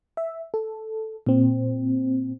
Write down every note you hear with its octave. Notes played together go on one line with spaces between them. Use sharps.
E5
A4
A#2 C4